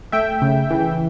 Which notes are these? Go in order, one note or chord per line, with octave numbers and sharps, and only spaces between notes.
A3 E5 G5
C#3
E3